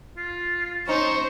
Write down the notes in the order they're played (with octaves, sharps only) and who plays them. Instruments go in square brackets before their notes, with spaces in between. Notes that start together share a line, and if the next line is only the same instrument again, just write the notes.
[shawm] F4
[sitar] C#4 D#4 [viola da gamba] C5 [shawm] C#6